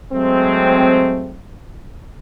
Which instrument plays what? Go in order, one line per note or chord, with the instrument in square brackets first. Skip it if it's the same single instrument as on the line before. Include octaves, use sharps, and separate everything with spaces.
[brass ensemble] F#3 G#3 A3 C4